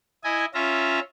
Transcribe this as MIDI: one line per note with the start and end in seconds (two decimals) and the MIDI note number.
0.24 0.45 64
0.24 0.45 75
0.24 0.45 80
0.54 0.99 61
0.54 0.99 65
0.54 0.99 76
0.54 0.99 82